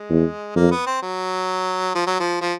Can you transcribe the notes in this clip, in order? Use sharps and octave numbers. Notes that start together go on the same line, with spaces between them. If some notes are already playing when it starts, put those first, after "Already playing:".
Already playing: G#3
E2
F2 A#3
B3
C4
F#3
F3
F#3
F3
F3